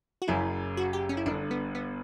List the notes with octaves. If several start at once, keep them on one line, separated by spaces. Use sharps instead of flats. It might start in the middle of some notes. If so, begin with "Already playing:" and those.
F#4
F#1 F#2 C#3 E4
F#4
G4
C#4
E4
G1 G2 D3 D4
B3
B3